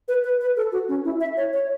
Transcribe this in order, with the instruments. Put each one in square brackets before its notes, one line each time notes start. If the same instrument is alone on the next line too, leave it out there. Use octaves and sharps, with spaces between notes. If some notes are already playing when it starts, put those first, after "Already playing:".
[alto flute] B4
B4
B4
A4
F#4
C#4
E4
E5
C#5
C#5